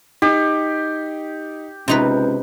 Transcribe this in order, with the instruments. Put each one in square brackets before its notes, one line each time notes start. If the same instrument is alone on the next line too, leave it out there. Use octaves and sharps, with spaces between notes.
[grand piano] D#4 [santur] G4
[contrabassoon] C#2 [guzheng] C3 D#4 B4